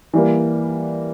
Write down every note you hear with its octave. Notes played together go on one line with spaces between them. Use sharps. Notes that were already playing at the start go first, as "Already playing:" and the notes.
E3 G3 A#3